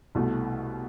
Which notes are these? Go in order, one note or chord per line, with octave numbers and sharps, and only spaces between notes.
C2 B2 A3